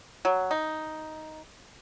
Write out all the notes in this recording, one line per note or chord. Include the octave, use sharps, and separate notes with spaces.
F#3
D#4